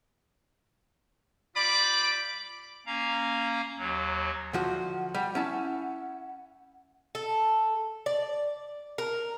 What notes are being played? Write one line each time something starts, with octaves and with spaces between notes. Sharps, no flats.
G3 F4 D5 B5 D6
A#3 C#4 F5 A#5
D#2 F#3
D2 F3 F#4 F#5
G3
C#4 E4 A5
A4
D5
A#4